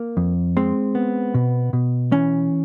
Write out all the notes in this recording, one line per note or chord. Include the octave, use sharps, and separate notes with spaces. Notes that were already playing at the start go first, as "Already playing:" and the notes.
Already playing: A#3
F2
G#3 C4
B3
B2
B2
E3 C#4